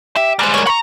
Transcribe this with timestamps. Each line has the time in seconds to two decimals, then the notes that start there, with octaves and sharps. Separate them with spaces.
0.16 G4 E5
0.39 G3 G#3 C5 A#5
0.54 A#4 C#5
0.67 A#5 B5 C#6